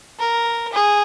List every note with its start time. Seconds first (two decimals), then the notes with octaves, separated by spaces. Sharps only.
0.19 A#4
0.72 G#4